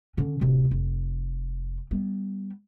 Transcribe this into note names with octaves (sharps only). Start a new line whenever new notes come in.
D3 C#4
D1 C3
F1
G3 B3